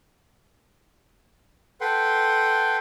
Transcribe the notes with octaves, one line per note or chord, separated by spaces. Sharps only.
A4 B4 F#5 G5 C6